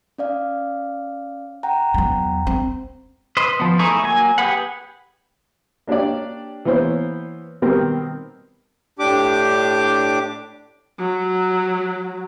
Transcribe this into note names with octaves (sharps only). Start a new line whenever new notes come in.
C#4 D5 F5
F#5 G5 A#5
E2 F#3
C4
B4 C5 D#5
F3 B3
A3 D#4 E4 G#4 C#6
F#3 A#3 G#5
G4 G#4 B4 F#5
A#3 D4 G4 C#5 D5
E3 A#3 B3 C5 C#5
B2 D#3 G3 B3 C4 A#4
A2 D4 G4 D6
F#3